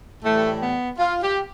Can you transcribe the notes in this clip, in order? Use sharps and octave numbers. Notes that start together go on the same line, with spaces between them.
A2 E3 G3 A3
B3
F4
G4